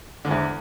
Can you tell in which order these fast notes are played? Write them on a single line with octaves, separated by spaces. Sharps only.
D3 G#2 E2